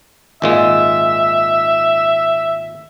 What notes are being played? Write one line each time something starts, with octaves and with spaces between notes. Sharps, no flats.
G#1 A#2 G#3 E5